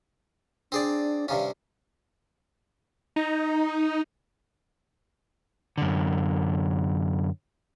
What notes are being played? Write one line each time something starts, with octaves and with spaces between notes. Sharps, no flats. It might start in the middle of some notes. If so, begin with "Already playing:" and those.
C4 D4 G#4 D5
G2 C3 C#4 F5
D#4
F#2 D3